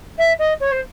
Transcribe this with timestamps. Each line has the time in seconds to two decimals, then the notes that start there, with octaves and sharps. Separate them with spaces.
0.18 E5
0.39 D#5
0.60 C#5
0.71 C5